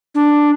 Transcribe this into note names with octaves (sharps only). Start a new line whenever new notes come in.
D4